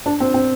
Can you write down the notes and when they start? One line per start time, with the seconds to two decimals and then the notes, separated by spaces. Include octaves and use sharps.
0.06 D4
0.20 C4
0.34 C4